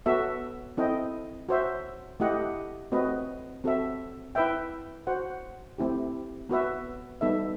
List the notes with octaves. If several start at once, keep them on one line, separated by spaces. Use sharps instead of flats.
B3 F#4 A4 E5
C4 E4 A4 D#5 G5
F#4 C5 E5
A3 E4 G4 D#5 F#5
A3 C4 F#4 B4 D#5
C4 F#4 A4 E5
E4 B4 E5 G5
F#4 C5 F#5
A3 C4 E4 G4
B3 F#4 B4 E5
G3 B3 D#4 A4 E5